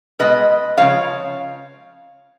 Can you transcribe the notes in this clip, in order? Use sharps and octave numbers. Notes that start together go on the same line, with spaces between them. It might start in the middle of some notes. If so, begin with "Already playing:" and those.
B2 G#3 B4 D#5
C#3 F3 G#3 C#5 F5